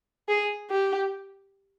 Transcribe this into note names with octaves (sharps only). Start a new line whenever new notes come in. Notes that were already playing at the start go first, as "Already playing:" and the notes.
G#4
G4